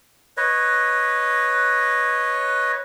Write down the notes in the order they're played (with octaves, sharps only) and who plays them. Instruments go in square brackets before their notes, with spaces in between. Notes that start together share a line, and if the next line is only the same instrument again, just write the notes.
[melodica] B4 C#5 D#5